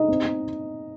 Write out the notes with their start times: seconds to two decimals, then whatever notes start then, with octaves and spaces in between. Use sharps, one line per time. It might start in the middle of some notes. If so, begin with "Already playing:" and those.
Already playing: D#4 D#5
0.08 C4
0.25 C4